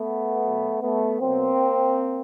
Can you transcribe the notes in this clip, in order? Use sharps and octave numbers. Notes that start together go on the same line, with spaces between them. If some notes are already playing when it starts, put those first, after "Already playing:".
Already playing: A3 B3
B2 F#3
A3 B3
B2 F#3 A#3 C4